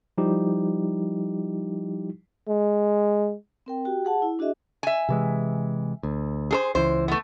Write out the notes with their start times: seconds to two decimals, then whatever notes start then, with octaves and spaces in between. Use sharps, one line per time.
0.18 F3 G3 D#4 E4 G4
2.48 G#3
3.66 C4 A#4 G5
3.85 F#4 G4 G5
4.05 G#4 F#5 A5
4.22 E4
4.39 D4 F#4 G#4 D#5 E5
4.83 E5 G#5
5.09 C3 E3 G#3
6.03 D2
6.51 G#4 A4 C5
6.75 C#2 E3 C5
7.08 A3 B3